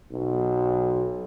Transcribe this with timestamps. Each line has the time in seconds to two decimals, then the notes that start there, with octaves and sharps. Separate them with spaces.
0.11 B1